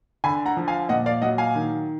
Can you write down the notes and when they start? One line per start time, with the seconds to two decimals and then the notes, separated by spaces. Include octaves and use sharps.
0.24 D3 G#5 B5
0.46 F#5 A#5
0.57 F3
0.68 F5 G#5
0.89 A#2 D#5 F#5
1.06 D5 F5
1.22 F#3 D#5 F#5
1.38 F5 G#5
1.55 D#3